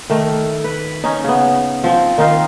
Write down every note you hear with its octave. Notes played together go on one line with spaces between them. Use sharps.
D#3 A3
B4
C#4 D#4
C#3 B3
F3 C4
D#3 D#4 F4